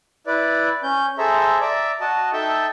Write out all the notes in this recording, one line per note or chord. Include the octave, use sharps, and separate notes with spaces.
E4 B4 D5
C#4 G6
G#4 A4 C5 E5 A#5
D5 E5 A#5 D6
F#4 D#5 A5
D#4 A4 E5 G5 A5